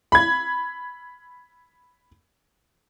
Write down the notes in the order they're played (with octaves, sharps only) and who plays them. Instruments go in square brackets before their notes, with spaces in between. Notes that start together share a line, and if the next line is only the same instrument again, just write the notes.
[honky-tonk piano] B5 G#6